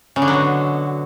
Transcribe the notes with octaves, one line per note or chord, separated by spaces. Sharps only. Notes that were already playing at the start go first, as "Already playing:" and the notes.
C#3
D3
F#3
B2